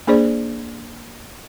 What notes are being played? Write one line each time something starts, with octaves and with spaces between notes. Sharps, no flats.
A#3 D4 G#4 C5 D5